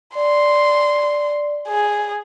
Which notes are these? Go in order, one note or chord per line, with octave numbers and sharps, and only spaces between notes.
D5 C6
G#4